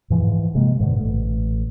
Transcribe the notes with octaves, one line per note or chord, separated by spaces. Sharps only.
G#2 E3 F3
C3 D#3 G#3 A#3
G#2 B2 D3
A1 A3